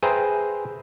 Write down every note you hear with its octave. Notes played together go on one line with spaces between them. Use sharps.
G#4 B4 C5 E5 G5 A#5